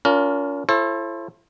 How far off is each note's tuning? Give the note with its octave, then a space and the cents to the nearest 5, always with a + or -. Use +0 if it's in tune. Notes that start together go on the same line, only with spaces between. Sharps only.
C#4 +40 F4 +10 A#4 +0
E4 +40 A4 +0 C5 +45